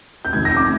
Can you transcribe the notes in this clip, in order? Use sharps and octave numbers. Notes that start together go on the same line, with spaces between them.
G6
F1 F2 D#3 G#3 G#6
A#6
D6